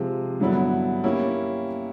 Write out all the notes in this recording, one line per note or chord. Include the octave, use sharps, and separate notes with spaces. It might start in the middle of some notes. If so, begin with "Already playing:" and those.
Already playing: C3 F3 G#3
G2 D3 F#3 B3 E4
A#3 C#4 E4 G4